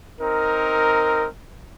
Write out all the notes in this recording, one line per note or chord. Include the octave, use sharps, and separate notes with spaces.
C4 D#4 A#4